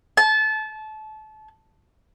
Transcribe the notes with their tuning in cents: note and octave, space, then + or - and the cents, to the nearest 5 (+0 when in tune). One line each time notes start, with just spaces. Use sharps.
A5 -25